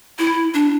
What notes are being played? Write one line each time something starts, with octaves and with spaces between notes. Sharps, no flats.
E4
D4